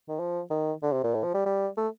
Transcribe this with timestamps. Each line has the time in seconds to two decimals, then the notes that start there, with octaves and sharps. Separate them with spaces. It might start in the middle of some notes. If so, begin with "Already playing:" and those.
0.08 D#3
0.19 F3
0.50 D#3
0.83 D3
0.92 C3
1.04 A#2
1.14 A2
1.24 F3
1.34 G3
1.46 G3
1.77 A3